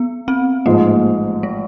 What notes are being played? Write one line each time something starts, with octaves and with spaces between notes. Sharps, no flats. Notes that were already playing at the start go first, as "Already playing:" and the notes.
Already playing: B3
C4
A1 G#2 F3 G#3 A#3
G#3